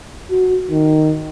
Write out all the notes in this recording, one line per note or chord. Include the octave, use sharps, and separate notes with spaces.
F#4
D#3